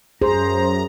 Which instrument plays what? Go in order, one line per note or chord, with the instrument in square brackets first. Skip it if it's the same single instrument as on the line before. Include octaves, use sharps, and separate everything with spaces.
[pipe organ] F#2 A#5 [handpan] G#4 [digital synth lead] C5